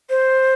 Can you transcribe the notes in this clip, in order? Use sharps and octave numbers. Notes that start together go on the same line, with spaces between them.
C5